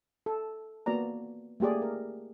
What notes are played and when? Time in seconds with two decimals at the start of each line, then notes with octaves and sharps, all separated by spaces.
0.26 A4
0.86 A#3 B3 F#4 D5 A#5
1.60 A3 A#3 G4 G#4 D5
1.82 A#4